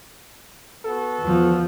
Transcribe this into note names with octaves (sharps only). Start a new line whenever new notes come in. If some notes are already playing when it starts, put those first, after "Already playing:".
B3 F#4 A4
E2 F3